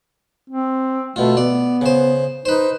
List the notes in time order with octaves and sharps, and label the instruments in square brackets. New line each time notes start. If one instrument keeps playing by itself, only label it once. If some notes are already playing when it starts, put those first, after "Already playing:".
[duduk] C4
[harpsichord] B2 F4 [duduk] A3
[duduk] B3 [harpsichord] D5
[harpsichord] C#3 C5
[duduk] D#4 [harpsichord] B4 C5